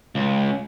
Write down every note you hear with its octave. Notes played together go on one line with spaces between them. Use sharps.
C#2